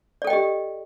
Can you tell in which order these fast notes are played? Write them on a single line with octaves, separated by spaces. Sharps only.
D5 A4 G5 D#5 G4